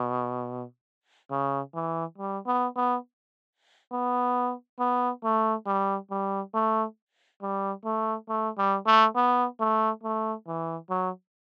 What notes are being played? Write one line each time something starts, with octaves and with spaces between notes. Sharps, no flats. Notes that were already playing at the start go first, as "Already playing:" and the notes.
Already playing: B2
C#3
E3
G3
B3
B3
B3
B3
A3
G3
G3
A3
G3
A3
A3
G3
A3
B3
A3
A3
E3
F#3